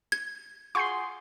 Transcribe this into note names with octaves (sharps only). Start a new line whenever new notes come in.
G#6
F4 F#4 G#4 C6 C#6 G6 C7